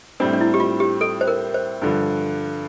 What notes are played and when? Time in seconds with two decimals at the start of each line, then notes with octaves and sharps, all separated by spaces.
0.20 A2 G3 C4 D4
0.33 D4
0.41 E4
0.54 G4
0.60 F4
0.80 G4
1.01 A4
1.21 C5
1.27 A#4
1.54 C5
1.82 G2 D3 F3